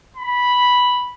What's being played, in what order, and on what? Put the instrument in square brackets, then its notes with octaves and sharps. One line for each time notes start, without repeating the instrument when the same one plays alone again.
[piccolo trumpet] B5